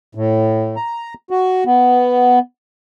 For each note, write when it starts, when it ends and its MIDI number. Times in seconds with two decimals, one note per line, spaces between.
0.15 0.76 45
0.76 1.14 82
1.31 1.64 66
1.65 2.39 59